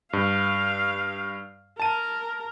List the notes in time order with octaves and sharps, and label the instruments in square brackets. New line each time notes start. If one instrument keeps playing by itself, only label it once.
[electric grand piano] G2 [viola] F5
[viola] A#4 [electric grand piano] A5 D#7